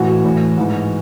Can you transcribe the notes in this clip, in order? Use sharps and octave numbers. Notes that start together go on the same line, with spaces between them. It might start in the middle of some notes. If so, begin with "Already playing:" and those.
Already playing: A2 E3 F#4
A2 E3
G#2 E3